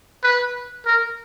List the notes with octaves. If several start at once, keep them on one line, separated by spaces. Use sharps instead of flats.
B4
A#4